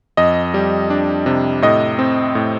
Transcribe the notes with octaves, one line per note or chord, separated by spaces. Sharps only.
F2 D#5
G3
D4
C3
A2 D#5
C4
A2